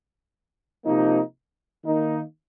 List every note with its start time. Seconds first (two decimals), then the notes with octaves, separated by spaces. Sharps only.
0.84 C3 F3 A#3 D#4
1.84 D#3 A#3 D#4